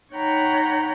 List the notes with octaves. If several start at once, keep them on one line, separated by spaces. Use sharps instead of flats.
D#4 C#5 F#5 G5 A#5 B5